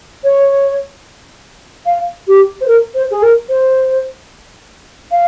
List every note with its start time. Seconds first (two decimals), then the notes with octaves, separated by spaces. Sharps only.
0.24 C#5
1.86 F5
2.28 G4
2.61 C5
2.68 A#4
2.95 C5
3.11 G#4
3.22 A#4
3.49 C5
5.12 F5